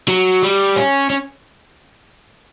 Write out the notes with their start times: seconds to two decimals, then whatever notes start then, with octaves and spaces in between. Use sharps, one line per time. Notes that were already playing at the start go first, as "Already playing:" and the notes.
0.08 F#3
0.43 G3
0.76 C#4
1.10 C#4